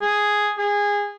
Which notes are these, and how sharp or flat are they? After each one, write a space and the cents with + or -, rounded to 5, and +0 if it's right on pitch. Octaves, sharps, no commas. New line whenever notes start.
G#4 +0
G#4 -20